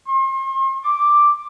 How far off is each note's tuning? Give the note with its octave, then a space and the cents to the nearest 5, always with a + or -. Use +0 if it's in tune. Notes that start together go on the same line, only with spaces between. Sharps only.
C6 +40
D6 +5